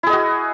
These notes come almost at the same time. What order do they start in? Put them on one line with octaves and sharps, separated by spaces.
E4 G#4 D#5 F#4